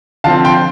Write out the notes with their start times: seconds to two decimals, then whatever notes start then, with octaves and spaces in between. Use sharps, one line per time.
0.24 D3 F3 C4 F5 A5
0.45 G5 C6